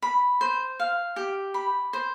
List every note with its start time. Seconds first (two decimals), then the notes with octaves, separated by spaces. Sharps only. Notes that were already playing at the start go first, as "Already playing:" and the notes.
0.02 B5
0.41 C5
0.80 F5
1.16 G4
1.54 B5
1.93 C5